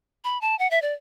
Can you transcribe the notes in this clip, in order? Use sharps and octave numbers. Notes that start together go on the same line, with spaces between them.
B5
A5
F#5
E5
D5